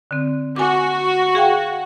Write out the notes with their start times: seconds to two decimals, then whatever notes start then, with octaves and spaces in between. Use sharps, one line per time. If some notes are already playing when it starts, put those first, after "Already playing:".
0.11 D3 C4
0.56 F#4 G#5 D6
1.35 G#4 F5 G5